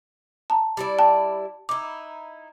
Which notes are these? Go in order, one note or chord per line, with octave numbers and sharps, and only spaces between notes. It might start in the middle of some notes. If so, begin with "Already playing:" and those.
A5 A#5
G3 E4 D5
G5 A5
D#4 E4 D6